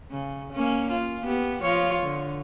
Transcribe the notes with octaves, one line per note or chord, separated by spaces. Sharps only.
C#3
A#3 C#4
F4
B3 G4
F3 F4 C#5
D3